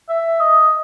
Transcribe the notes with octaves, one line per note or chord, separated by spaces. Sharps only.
E5
D#5